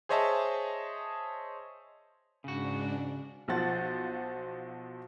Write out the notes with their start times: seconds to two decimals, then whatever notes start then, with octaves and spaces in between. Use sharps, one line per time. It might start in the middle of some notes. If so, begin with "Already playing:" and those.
0.09 G#4 C5 C#5 D#5 E5 A5
2.44 G#2 C#3 D4 F#4
3.48 B1 F3 C5 F#5 A6